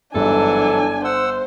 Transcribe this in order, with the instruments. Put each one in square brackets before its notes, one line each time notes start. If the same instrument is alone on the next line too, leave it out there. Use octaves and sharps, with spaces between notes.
[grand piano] G1 [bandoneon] G#2 E3 F#3 [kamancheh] D4 G#5 [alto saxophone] A4
[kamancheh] C5 [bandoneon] F#5 E6